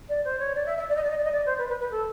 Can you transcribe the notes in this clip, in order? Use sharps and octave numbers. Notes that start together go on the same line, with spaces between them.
D5
C5
C#5
D5
E5
E5
D5
D#5
D5
D#5
D5
D#5
D5
C5
B4
B4
B4
A4